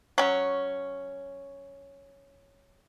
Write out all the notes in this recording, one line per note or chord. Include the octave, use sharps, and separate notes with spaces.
F#3 C#4